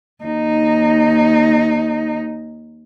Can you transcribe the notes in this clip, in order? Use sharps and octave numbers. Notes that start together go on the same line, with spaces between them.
D#2 D#4